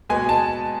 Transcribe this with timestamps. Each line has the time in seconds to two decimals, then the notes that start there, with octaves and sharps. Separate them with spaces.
0.09 B2 G#3 B3 G#5
0.29 A5